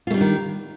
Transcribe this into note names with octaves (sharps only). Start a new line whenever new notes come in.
D#3 G3 A3 D4 F4